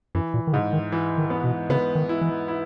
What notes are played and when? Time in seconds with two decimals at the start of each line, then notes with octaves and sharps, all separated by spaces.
0.15 F#2 E3
0.34 A#2
0.47 D#3
0.53 G#2 C#3
0.73 D#3
0.92 E3
1.18 D#3
1.30 B3
1.44 B2
1.69 C#3 B3
1.95 D#3
2.09 E4
2.21 E3
2.48 E4